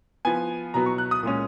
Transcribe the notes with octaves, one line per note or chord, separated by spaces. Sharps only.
F3 B3 G#5
B2 F#3 B3 A#5
C#6
F#6
D#6
A#2 G#3 C#4